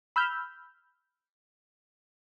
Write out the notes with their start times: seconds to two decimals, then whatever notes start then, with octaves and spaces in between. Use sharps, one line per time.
0.16 B5 E6 F6 G6